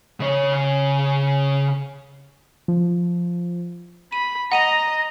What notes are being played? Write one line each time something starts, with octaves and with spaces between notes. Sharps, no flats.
C#3 C#5
F3
B5 D#7
D#5 F#5 A#5 A#6 D#7 F7